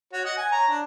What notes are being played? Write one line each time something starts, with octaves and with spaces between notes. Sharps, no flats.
F#4 C#5
D#5 F#5
G#5
C#5 A#5
D4